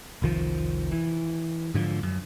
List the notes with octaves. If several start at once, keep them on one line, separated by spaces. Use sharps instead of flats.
F1 C2 D#3 F3
E3
G#2 D3 E3 F3
F#2